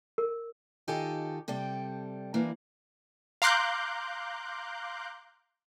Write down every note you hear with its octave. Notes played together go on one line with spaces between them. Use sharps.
A#4
D#3 D#4 F4 G4 A4 G#5
C3 G3 A4 G5
E3 G3 A#3 D4
F5 A#5 C6 D6 F#6 G6